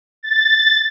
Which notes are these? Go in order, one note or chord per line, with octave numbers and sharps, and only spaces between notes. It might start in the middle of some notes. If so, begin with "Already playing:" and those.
A6